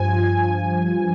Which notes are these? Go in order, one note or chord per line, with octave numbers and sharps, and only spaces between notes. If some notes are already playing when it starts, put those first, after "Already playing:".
Already playing: G2 F3 G#5
G2
F3
F3